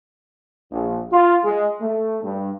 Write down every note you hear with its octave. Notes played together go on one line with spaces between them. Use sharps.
A#1
F4
G#3
A3
G2